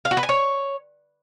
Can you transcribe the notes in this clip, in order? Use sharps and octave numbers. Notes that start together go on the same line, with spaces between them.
F5
F#4
B4
G#5
C#5